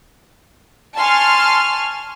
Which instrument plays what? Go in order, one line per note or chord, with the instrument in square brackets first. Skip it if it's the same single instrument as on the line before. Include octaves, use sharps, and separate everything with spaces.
[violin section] G#5 A5 C6 C#6 F6